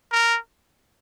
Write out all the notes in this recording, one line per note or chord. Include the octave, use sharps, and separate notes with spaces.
A#4